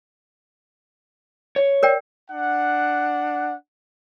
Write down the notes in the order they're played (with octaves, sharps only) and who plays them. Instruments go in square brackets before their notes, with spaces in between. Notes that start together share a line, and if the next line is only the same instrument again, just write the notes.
[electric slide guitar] C#5
[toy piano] A#4 D5 G5
[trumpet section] D4 F#5